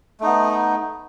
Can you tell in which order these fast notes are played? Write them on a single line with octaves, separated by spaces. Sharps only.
A3 D#4 B3